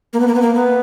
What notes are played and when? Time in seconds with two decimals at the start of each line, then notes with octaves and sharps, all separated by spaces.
0.13 A#3
0.20 B3
0.28 A#3
0.35 B3
0.42 A#3
0.55 B3